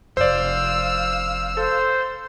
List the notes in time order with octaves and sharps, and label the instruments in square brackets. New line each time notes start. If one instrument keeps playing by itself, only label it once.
[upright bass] F1 F3 [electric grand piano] C5 D5 [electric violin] F5 E6
[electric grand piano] A4 [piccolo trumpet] C5